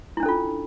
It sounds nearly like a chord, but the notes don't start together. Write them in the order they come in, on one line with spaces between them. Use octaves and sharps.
E4 D4 C#4 A4 F4